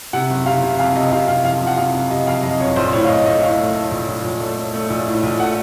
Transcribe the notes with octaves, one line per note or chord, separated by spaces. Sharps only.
C3 F#5
F#1
C3 F5
C3
F2 F5
C3 D#5
C3 F5
C3 F5
F3 F5
F3
F#5
C3 F5
F#1
C3 D#5
F2 F5
F2 D#5
F#1 C#5
A#1 C5
A2 C#5
F5
A#1 D#5
A3 D#5
A2 F5
A3
A3
A#1
A#1
A#1
A3
A3
A3
A#1
A2
A#1
A3 F#5